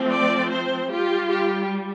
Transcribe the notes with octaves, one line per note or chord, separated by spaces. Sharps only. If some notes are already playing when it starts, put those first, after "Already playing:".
Already playing: F3 A3 C4
D5
C5
G3 F4 G4
G4